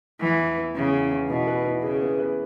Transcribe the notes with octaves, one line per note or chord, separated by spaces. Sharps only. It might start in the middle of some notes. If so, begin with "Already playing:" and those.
E2 E3
E2
B3
E2 C#3
E2
E2
B2 E3
B4
E3
C#3 G#4
B3
B4